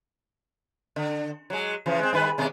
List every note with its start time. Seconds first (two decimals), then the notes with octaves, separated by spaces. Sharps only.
0.96 D3
1.50 F#3 G#3
1.86 C#3 E3 F3
1.99 G#3 C4
2.13 G2 D#3 B4
2.38 D#2 B2 G#3